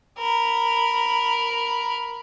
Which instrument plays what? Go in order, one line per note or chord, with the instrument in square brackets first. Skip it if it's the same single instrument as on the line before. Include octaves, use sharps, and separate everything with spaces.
[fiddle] A#4 B5